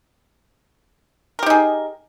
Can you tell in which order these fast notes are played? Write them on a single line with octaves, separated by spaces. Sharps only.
A#4 G4 D#4 G#4